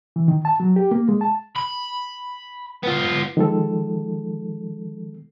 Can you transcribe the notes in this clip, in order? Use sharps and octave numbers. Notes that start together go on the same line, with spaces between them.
E3
D#3
A5
F#3
G4
A#3
G#3
A5
B5
B3 F4
D#3 F3 G#3 A4